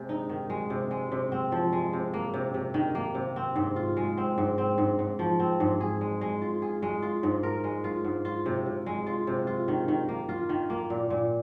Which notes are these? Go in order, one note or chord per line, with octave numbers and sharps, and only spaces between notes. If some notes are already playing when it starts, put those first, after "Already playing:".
Already playing: C3 G#3
D#4
D#3
G#3
C3
G#3
C3
C4
F3
G#3
C3
A#3
C3
C3
D#3
A#3
C3
C4
G#2
F4
G#3
C4
G#2
C4
G#2
G#2
F3
C4
G#2
G#4
G#3
G#3
F4
G#4
G#3
F4
G#2
A#4
G#3
F4
G#2
F4
C3
C3
G#3
F4
C3
F4
D#3
D#3
A#3
F4
D#3
A#3
A#2
A#2